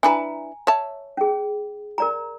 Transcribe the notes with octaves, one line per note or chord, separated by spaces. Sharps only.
D4 E4 B4 G#5 A#5
C#5 E5 A5
C#4 G#4
A#4 D5 A#5